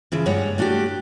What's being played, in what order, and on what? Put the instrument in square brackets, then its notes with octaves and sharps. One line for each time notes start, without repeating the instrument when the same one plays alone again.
[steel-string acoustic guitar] C#3 E3 F3
G2 G3 G#3 C#5 F#5
G2 A3 D4 F#4 G4